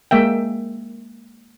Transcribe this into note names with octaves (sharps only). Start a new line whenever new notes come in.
G#3 A#3 E5 G5